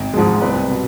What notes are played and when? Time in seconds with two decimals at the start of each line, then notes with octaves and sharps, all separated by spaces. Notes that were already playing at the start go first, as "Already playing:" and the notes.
Already playing: G#1
0.14 G#2 F3 G#3
0.42 C2 B4
0.70 B2